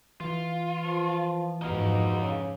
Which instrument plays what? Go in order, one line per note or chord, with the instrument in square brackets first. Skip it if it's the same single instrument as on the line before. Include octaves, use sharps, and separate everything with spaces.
[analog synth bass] E3 [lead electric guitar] F4
[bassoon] F3
[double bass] F2 G#2 [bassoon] B2 [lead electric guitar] D#4 F5
[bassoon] C#3